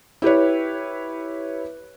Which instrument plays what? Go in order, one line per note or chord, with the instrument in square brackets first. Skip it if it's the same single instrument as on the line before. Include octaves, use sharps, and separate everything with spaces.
[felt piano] E4 G4 B4 C#5